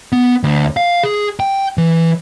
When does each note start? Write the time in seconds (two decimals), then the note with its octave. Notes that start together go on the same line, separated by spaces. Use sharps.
0.12 B3
0.44 D2
0.77 F5
1.03 G#4
1.40 G5
1.78 E3